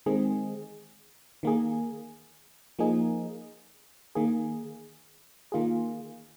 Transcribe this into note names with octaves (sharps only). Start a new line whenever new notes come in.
D#3 G#3 C4 G#4
D#3 A#3 G#4
F3 A#3 D#4 G#4
D#3 A#3 G#4
D#3 A#3 F4 G#4